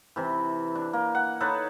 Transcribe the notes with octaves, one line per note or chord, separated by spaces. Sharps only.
C3 E3
D4
A#3
F#5
D#4 A4 B4 C#5